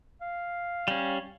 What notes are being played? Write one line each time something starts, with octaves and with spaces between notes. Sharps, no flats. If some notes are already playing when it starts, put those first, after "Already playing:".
F5
G3 C#4